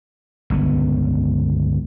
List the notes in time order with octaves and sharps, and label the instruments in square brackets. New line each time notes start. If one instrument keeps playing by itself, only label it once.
[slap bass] G1 C#2 B3